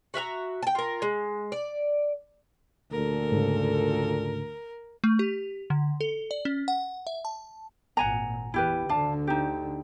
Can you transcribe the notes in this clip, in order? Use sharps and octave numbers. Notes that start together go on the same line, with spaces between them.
F#4 E5 F5 A#5
G5 A5
F4 A#4
G#3
D5
D2 A#2 A4 A#4
G#2 C#3
A3
G4
D3
A4
D5
C#4
F#5
E5
A5
G#1 A#2 F#5 G#5 A#5
E2 E4 G4 B4
D2 D3 D4 F5 A5
D#4 G4